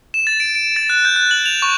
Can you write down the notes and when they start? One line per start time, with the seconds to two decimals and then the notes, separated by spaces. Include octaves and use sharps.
0.14 E7
0.27 A6
0.40 D7
0.55 D7
0.76 A6
0.90 F#6
1.05 G6
1.16 F#6
1.31 F#7
1.46 F7
1.62 C#6